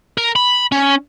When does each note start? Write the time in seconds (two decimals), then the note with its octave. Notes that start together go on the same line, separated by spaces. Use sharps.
0.18 A#4
0.36 B5
0.72 C#4